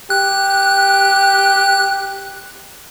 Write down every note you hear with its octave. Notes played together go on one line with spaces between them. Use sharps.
G4 F#6